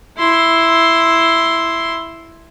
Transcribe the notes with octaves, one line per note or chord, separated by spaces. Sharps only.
E4 C6